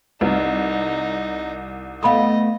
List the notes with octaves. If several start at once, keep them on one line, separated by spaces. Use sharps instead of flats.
C2 D#4 B4
A3 B3 D#5 F5 B5 D#6